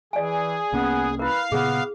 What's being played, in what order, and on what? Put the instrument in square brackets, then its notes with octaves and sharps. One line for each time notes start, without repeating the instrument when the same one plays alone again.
[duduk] E3 [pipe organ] G#4 [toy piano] D5 G#5
[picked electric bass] C2 A#3 C#4 [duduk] B3
[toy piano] E4 A#4 [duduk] B4 [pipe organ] F5
[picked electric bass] A#2 C#3 [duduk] B3 [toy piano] G#4